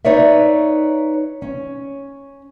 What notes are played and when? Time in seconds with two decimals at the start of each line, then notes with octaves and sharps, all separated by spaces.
0.05 D#4 B4 C#5 D5 E5
1.42 C#4